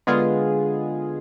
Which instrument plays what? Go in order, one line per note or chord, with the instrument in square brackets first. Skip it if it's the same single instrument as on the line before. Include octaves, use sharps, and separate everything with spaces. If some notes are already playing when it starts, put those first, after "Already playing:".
[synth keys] D3 G#3 B3 F4 G#4